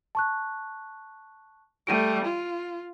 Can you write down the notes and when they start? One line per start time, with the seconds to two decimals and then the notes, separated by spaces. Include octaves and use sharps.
0.15 A5 C#6 F#6
1.87 G3 A3 D7 D#7
2.25 F4